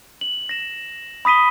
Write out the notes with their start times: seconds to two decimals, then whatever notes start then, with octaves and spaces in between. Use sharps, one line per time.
0.21 F#7
0.49 A#6 E7
1.25 B5 D#6 B6 D#7 G7